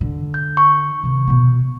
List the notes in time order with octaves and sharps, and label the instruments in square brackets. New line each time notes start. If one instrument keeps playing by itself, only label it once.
[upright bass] D3
[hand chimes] G6
C#6
[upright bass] C3 D#3
B2 B3